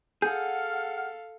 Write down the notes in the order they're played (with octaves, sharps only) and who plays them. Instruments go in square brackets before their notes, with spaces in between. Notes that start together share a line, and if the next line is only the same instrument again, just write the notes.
[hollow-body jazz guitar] G#4 [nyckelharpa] A4 F5 [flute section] F#5 F6 [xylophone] G6